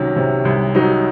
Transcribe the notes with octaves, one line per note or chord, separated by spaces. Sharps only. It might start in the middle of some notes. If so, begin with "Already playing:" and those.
Already playing: C2 C3 D#3 F#3 C#4
C3
C2
F#3 D#4